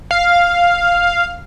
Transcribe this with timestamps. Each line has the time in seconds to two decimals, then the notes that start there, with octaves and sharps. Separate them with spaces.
0.11 F5